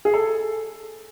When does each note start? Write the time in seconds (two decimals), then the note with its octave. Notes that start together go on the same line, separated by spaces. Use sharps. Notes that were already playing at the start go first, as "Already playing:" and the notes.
0.05 G#4
0.14 A4